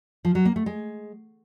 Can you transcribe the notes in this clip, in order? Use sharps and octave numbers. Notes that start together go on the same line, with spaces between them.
F3
F#3
A#3
A3
G#3